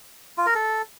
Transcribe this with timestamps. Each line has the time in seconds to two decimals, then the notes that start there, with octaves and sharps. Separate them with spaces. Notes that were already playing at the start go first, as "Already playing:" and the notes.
0.38 F4
0.46 A#4
0.55 A4